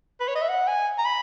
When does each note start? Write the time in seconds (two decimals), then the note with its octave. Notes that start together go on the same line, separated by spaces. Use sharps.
0.20 B4
0.28 C#5
0.35 D#5
0.41 E5
0.49 F#5
0.67 G#5
0.98 A#5
1.05 B5